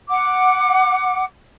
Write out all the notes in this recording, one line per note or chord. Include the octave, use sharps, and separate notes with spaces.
F#5 D6